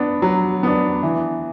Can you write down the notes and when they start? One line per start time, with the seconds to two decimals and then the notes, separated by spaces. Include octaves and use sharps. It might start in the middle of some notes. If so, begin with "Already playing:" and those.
Already playing: B3 D4
0.22 F#3
0.63 B3 D4
1.03 E3